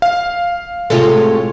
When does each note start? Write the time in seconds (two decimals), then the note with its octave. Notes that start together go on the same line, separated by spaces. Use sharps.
0.02 F5
0.90 A2 C3 G#3 F4 A4 C#5